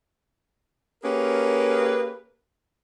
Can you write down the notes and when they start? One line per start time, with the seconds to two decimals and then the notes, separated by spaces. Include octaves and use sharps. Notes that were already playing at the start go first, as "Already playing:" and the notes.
1.03 A#3 C#4 G4 G#4 A#4 B4